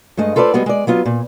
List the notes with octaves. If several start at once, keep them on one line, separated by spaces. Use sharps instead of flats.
G2 G#3 A3 D#5
F4 A4 B4 C5 D5
G3 G#3 B3 F#4
G#3 D5
F#3 B3 F4
A#2